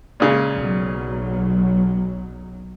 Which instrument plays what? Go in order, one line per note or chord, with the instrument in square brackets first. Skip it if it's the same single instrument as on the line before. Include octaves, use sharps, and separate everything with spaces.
[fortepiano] A#2 C#3 G#3
[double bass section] B1 F#3